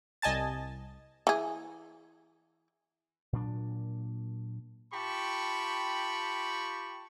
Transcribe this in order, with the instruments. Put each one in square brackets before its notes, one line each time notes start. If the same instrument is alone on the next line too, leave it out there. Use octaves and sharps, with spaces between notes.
[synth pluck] C2 D#5 G#5 A5 A6
[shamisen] E3 G#4
[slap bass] A#2 F#3 D4
[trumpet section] F4 G4 G5 A5 B5 C#6